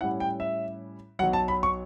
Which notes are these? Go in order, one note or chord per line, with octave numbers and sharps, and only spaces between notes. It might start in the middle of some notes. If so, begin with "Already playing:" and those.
A2 G3 C#4 E4 F#5
G5
E5
B1 B2 F#3 F#5
A5
B5
C#6